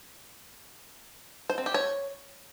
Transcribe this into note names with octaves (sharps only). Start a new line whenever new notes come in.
C5
C4
G4
C#5